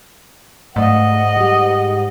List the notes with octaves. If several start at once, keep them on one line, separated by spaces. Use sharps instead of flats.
G#2 A3 D5 D#5 F5 F#5
G3 G4